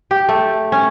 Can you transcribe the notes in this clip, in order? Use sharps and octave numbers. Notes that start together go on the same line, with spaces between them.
G4
A3
C#4